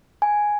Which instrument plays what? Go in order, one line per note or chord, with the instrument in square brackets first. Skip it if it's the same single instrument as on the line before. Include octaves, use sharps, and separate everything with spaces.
[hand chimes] G#5